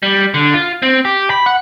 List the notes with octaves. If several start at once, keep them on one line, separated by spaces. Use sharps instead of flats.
G3
D3
F4
C4
G4
B5
F#5